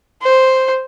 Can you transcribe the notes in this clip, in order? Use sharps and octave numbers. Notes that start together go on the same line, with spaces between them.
C5